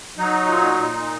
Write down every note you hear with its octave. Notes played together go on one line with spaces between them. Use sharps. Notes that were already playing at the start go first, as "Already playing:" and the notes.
F#3 D#4
A#2
A#2